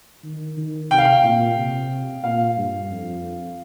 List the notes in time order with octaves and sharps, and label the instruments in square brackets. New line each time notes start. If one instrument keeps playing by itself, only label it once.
[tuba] D#3
D#3
[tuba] C3 [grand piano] G5
[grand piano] F5
G5
[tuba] A#2
C3
[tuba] A#2 [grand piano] F5
[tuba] G2
F2